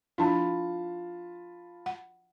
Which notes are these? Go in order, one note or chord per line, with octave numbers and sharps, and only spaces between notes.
F3 D4 E4 F4 A5 B5
F#5